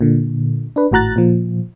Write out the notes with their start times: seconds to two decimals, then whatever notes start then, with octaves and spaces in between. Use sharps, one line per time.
0.01 A#2 D3
0.76 D4 B4
0.92 G#1 A2 F#4 A#5 F#6 A6
1.16 A#2 F3